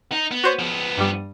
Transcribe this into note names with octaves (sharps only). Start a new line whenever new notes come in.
D#4
B3
F#4 C5 C#5
F3 B3
G2 G3